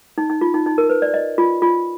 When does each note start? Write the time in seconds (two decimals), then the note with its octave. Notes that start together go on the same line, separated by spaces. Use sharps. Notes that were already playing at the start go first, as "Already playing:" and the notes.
0.18 D#4
0.30 D#4
0.41 F4
0.54 D#4
0.66 D#4
0.78 A#4
0.90 B4
1.02 D5
1.14 D#5
1.38 F4
1.62 F4